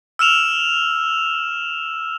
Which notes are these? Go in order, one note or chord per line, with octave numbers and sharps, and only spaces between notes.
E6 F6 E7 F7